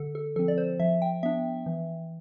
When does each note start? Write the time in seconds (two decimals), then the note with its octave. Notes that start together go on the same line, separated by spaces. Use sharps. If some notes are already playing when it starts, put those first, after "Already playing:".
Already playing: D3 A4
0.15 A4
0.36 F3 C4 A4
0.48 D5
0.58 C5
0.80 F3 E5
1.02 G5
1.23 B3 D4 E5
1.66 E3